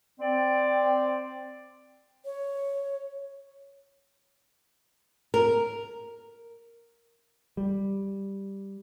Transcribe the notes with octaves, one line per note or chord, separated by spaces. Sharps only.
C4 D5
C#5
A#4
G3